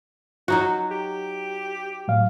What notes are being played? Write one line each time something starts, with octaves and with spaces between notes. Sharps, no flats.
F#3 D#4 F#4
G4
A2 F#3 F5